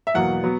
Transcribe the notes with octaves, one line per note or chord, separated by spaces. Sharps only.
E5
E2 B2 F#3 A#3 F#5
F#3 B3